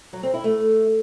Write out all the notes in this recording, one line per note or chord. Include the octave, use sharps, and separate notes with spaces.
F#3
C4
E4
A3